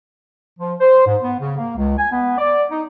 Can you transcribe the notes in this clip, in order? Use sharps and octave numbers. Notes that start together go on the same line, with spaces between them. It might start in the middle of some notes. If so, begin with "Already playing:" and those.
F3
C5
G#2
B3
C#3
A#3
C#2
G#5
B3
D5
D#4